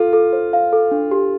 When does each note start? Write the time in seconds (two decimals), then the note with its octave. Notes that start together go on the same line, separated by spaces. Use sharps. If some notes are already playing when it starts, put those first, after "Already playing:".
Already playing: F4 A4 F5
0.13 A4
0.33 C5
0.53 F5
0.73 A4
0.91 D4
1.11 G4